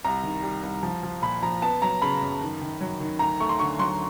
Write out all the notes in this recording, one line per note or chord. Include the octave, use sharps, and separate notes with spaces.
C2 A#5
D#3
G3
C2
F3
F3
A#2 B5
F3 A#5
B3 A5
F#3 A#5
C#3 B5
F#2
D#3
D#3
F#3
D#3
D2 A#5
A3 C#6
C6
D3 C#6
F#3 C6